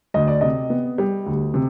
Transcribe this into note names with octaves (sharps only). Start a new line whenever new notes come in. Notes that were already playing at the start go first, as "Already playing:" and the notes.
D2 D#5
D5
C3 D#5
B3
G3
D2
C3